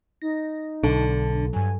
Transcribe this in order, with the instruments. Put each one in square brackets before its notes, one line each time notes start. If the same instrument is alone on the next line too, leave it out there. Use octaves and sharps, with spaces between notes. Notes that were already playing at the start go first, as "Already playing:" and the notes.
[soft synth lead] D#4 [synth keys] A#6
[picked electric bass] B1 [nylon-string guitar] D3 [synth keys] D4 A5
[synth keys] G2 F#3 [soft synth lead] G#5